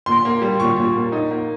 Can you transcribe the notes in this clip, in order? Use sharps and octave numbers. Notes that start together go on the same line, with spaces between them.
A#2 C6
A#3
G3
A#2 C#6
A#2
A#3
D#4
A#3